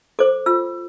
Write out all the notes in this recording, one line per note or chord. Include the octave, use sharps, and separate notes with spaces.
A4 C5 D6
F4 E6